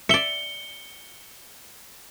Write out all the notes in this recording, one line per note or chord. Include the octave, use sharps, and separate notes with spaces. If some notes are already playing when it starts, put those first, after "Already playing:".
D5 E5 C#7 G7